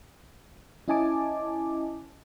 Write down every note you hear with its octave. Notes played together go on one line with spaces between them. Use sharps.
C#4 E4 D#5 G#5 A5 D6